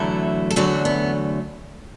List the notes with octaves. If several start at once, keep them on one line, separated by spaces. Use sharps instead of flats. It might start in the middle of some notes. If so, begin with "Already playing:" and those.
Already playing: E2 D3 F#3 A3 E4 A4
A4
E2 D3 F#3 A3 D4 F#4
B3